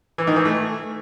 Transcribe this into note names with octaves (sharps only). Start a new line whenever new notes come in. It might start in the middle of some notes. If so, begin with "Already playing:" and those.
E3
D#3
E3
A3